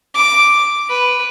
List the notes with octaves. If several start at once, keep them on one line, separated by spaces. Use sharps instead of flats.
D6
B4